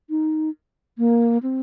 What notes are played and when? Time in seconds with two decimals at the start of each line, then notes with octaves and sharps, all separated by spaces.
0.10 D#4
0.98 A#3
1.43 C4